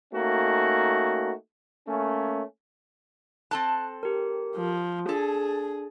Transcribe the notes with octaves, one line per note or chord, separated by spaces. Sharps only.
A3 A#3 C#4 D#4 F#4
A3 A#3 C#4
C4 A4 A5 F#6
G4 A#4
F3
D4 G#4 A4